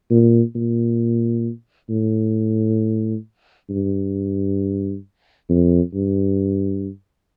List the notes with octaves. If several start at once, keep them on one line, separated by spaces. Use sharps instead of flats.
A#2
A#2
A2
G2
F2
G2